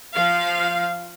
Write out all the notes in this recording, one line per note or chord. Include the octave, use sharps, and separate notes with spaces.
F3 F5